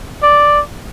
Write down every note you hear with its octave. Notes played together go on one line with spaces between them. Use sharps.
D5